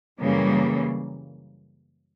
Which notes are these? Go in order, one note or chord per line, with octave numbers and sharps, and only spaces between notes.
F#2 C#3 E3 G3 A#3